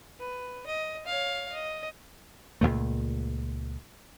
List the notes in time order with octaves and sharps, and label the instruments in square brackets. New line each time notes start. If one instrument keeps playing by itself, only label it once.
[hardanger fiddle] B4
D#5
C#5 F5
D#5
[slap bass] C#2 F#2 A#2 A3